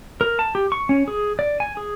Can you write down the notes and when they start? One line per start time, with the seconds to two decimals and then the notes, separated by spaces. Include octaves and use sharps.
0.21 A#4
0.39 A5
0.55 G4
0.72 C#6
0.89 C#4
1.08 G#4
1.39 D5
1.60 G#5
1.77 G#4